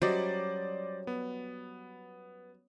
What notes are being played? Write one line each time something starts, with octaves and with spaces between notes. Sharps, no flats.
F#3 G3 C#4 C5 D5 D#5
B3